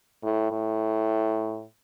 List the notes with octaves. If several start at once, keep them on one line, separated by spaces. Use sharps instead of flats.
A2
A2